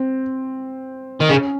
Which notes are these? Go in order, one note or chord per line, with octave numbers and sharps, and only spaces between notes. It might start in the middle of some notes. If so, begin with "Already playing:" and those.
Already playing: C4
D#3
C#3 C#4